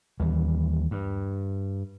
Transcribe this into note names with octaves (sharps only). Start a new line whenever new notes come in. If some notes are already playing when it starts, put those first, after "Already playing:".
D#2 E3 G3
G2